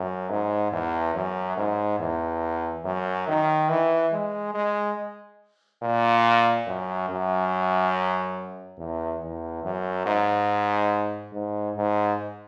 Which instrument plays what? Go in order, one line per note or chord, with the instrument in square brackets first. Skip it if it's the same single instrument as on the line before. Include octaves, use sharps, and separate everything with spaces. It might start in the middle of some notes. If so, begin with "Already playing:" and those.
Already playing: [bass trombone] F#2
G#2
E2
F#2
G#2
E2
F#2
D#3
E3
G#3
G#3
A#2
F#2
F#2
E2
E2
F#2
G#2
G#2
G#2